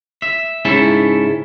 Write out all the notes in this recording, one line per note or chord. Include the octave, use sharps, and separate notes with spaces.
E5
G#2 C#3 C#4 E4 A4 E5